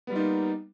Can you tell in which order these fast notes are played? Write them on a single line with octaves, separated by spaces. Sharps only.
B3 G3 F4 D#4 A#3